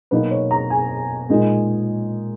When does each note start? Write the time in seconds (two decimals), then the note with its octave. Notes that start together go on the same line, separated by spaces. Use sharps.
0.11 B2 F#3 A#3 D#4 B4
0.31 C#5
0.51 A#5
0.70 G#5
1.29 A#2 G#3 D#4